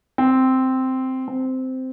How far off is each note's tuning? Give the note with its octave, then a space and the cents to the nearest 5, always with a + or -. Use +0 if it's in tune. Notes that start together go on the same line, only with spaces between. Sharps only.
C4 -5
C4 -10